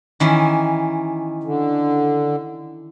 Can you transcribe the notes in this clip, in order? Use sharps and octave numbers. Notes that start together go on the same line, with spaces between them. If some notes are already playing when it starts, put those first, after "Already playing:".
D#3 E3 C#4
D3